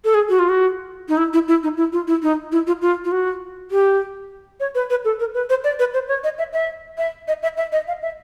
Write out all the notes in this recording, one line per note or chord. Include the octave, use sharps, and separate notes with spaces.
A4
G#4
F#4
F4
F#4
D#4
E4
E4
E4
D#4
E4
F4
E4
D#4
E4
F4
F4
F4
F#4
G4
C#5
B4
B4
A4
A#4
B4
C5
D5
B4
C5
C#5
D#5
E5
E5
E5
D#5
E5
E5
D#5
F5
E5